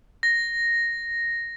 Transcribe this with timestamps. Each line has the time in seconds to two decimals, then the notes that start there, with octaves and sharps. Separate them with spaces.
0.23 A#6